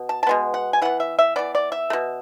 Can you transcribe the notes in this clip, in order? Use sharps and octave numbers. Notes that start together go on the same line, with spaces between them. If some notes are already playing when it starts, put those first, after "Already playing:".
Already playing: B2
A5
A5
B2 G#3 B3
F#5
G#5
E3 B3 F#5
E5
E5
E3 B3 D5
D5
E5
A3
B2